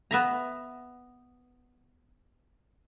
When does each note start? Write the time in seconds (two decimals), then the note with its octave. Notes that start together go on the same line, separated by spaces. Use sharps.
0.11 B3 E5 A#5